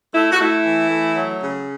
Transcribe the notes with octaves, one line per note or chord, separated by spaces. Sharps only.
A3 E4
F#4
A3 E4
E3
A3
F#3
C#3